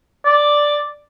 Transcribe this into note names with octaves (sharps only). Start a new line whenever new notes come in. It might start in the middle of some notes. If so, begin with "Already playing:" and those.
D5